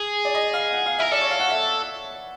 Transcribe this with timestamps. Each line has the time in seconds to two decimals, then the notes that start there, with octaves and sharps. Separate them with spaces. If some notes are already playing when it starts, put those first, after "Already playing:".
Already playing: G#4
0.25 D5
0.35 D#5
0.54 F5
0.73 F#5
0.86 F5
0.98 A#4 E5
1.12 A4 D5
1.21 C#5
1.31 F5
1.40 F#5
1.50 E5